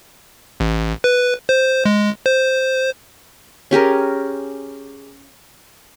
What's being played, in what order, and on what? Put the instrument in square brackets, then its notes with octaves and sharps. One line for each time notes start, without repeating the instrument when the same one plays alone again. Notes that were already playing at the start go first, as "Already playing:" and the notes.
[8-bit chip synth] A1
B4
C5
G#3
C5
[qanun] C#4 G4 G#4 A#4